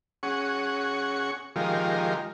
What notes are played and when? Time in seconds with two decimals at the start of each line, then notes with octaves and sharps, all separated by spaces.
0.23 C#4 G#4 F#5 C#6
1.56 D#3 F3 G#3 F4 G4 A#4